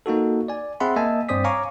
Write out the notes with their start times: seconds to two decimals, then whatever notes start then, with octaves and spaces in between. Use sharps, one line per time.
0.06 A#3 D#4 F#4 A4
0.48 D5 G#5
0.80 C4 G#4 E5 F#5 B5 C6
0.96 A#3 D#5 E5 G#5 A5
1.29 G2 C4 C5 D5 D#6 B6
1.44 C#5 F5 G#5 A#5 C#6 D6